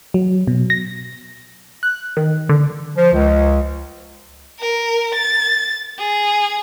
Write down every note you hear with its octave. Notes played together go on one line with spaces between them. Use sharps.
F#3
B2
A#6
F#6
D#3
D3
F3
C#2
A#4
A6
G#4